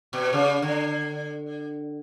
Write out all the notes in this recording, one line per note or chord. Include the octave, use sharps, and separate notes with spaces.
B2
C#3
D3